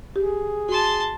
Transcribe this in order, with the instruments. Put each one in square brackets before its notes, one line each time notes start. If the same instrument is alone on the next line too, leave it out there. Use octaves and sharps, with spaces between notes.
[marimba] G4 [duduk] G#4
[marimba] F#4 [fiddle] A5 C6